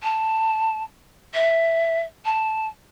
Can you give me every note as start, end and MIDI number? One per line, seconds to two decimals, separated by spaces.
0.03 0.83 81
1.34 2.03 76
2.25 2.68 81